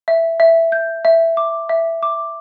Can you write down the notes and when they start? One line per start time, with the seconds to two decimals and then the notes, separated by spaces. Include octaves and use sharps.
0.08 E5
0.40 E5
0.72 G6
1.05 E5
1.37 D6
1.69 E5
2.03 D6